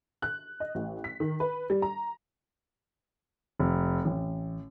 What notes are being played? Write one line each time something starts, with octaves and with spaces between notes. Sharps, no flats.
F#6
D#5
A1
B6
D#3
B4
G3
A#5
F1
A1